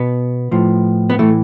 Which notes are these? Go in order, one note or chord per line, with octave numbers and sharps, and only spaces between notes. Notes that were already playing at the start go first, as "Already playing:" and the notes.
Already playing: B2 B3
A2 F3
B3
A2 E3 A3